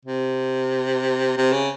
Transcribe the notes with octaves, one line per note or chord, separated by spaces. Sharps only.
C3
C3
C#3